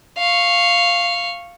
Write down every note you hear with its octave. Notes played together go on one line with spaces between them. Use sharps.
F5 C#6